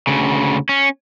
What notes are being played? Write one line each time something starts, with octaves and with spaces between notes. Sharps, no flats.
D2 C#3
C#4